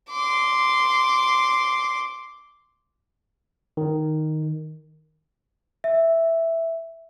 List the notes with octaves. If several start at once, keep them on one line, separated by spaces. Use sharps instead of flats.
C6 D6
D#3
E5